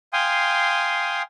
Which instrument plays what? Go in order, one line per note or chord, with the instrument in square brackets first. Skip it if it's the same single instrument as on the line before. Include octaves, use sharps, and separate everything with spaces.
[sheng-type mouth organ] F5 G5 G#5 C6 D#6